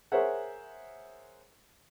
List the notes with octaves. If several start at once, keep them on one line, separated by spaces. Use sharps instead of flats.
G#4 A#4 C5 C#5 E5 F#5